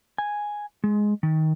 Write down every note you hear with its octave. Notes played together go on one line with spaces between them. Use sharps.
G#5
G#3
D#3